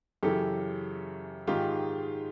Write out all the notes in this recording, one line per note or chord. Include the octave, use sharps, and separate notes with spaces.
F#2 C#3 E3 G4 A4
G#2 D#3 G#3 F4 G4